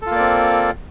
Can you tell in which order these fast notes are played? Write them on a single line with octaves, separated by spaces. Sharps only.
A4 F4 A#3 D5 C4